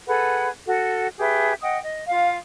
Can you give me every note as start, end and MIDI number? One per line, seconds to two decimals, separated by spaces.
0.07 0.49 68
0.07 0.49 69
0.07 0.49 71
0.07 0.49 78
0.66 1.09 66
0.66 1.09 69
1.18 1.54 67
1.18 1.54 68
1.18 1.54 71
1.18 1.54 76
1.62 1.78 75
1.62 1.78 78
1.62 1.78 79
1.62 1.78 87
1.82 2.04 75
2.08 2.38 65
2.08 2.38 77